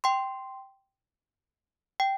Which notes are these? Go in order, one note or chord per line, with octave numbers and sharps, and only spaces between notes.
G5 C6
G5